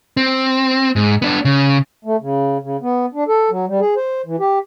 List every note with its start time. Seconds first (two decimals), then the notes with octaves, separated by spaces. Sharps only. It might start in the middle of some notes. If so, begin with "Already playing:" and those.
0.17 C4
0.96 G#2
1.22 B3 D4
1.45 C#3
2.05 A3
2.21 C#3
2.63 C#3
2.82 B3
3.14 D4
3.28 A4
3.50 F#3
3.68 G3
3.80 G#4
3.96 C5
4.26 E3
4.40 G4